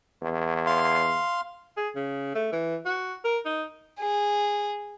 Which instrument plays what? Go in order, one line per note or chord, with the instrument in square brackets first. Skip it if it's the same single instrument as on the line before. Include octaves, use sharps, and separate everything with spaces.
[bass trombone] E2
[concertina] F5 C6
[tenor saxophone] G#4
C#3
A3
E3
F#4
A#4
D#4
[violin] G#4